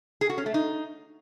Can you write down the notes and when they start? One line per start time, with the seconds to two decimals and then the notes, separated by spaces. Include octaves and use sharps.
0.21 G#4
0.29 F#4
0.38 C#4
0.46 A3
0.54 D#4